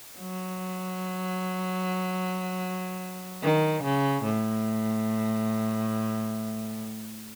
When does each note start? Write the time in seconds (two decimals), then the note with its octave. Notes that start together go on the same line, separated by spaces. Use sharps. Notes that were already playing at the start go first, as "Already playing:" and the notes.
0.19 F#3
3.43 D#3
3.83 C#3
4.23 A2